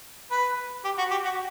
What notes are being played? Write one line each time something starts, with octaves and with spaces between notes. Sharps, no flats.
B4
G4
F#4
G4
F#4